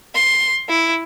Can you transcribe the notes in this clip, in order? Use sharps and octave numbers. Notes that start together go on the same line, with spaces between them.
C6
E4